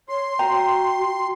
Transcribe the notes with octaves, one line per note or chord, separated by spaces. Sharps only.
C#5 C6
F#4 G5 A#5